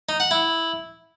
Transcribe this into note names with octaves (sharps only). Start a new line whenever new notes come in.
D#4
F#5
E4